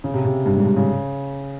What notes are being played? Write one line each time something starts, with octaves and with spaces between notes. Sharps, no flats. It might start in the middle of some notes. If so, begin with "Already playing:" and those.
C#3
C3
C3
G2
G#2
G2
C#3